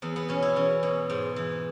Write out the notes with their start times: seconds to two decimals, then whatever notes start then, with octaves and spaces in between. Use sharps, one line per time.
0.02 E2 B3
0.16 B3
0.29 B2 C#4
0.42 E4
0.56 E2 C#4
0.83 B2
1.10 G#2
1.36 E3